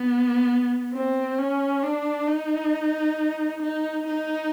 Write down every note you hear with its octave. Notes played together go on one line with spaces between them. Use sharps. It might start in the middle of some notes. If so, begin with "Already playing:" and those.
Already playing: B3
C4
C#4
D4
D#4
D#4
D#4